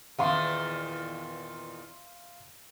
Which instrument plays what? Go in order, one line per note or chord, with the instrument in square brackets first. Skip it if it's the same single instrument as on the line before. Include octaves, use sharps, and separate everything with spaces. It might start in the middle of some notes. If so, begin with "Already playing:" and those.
[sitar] E2 A#2 D#3 [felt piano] E5 F5 C6